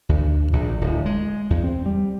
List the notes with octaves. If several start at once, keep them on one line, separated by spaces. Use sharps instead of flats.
D2
A#1
D1
G#3
E2
C4
G3